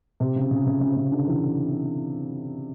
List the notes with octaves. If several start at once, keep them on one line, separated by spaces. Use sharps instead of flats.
C3
C#3
C#3
C#3
C#3
C#3
D3
E3